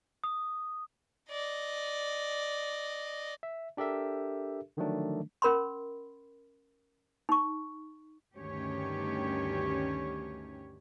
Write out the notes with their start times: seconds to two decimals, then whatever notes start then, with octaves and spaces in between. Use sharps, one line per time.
0.24 D#6
1.30 D5 D#5
3.43 E5
3.77 D4 G4 A4 A#4 E5
4.77 D3 D#3 F3 F#3 A3 D4
5.42 C#4 A#4 B5 C6
7.29 D#4 C#6
8.37 D2 G2 D#3 C#4 G4 C#5